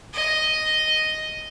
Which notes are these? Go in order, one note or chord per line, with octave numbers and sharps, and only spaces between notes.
D#5